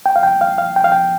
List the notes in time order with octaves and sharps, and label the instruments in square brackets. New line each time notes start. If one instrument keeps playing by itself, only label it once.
[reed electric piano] G5
F5
G5
F5
F5
G5
F5
G5